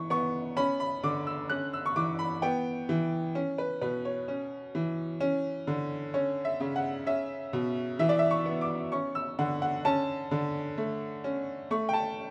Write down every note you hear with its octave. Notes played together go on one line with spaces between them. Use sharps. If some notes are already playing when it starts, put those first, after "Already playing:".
Already playing: E3 C#6
B3 C#6
C#4 B5
B5
D3 D6
E6
C#4 F#6
E6
C#6
E3 D6
B5
B3 G5
E3
C#4
B4
B2 B4
C#5
C#4
E3
C#4
D3
C#4 C#5
E5
C#3
F#5
C#4 E5
B2
E3 E5
D5
E5
C#6
B3
D6
C#4 C#6
E6
D3 F#5
F#5
C#4 A5
D3
A3
C#4
A3 C#6
G5
A5